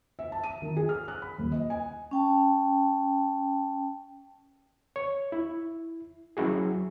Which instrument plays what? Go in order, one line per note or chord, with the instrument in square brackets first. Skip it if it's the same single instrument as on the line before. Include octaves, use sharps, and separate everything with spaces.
[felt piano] E5
A5
D#7
D#3
G#4
F6
F#6
B5
D#1
D#5
G#5
[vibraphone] C#4 G5 A5
[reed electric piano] C#5
E4
F#3 C#4 E4 F#4 G#4